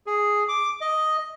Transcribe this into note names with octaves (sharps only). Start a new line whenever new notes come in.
G#4
D6
D#5